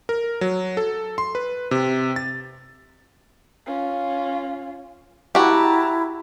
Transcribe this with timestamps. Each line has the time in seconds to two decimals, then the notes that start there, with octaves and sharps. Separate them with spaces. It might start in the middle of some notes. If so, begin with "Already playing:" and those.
0.09 A#4
0.41 F#3
0.77 A4
1.18 C6
1.35 B4
1.71 C3
2.16 A6
3.66 C#4 F4
5.35 E4 F#4 G4 A5 A#5